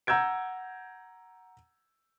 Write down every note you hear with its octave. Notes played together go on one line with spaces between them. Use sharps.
F#5 A#5 E6 G6 G#6 D7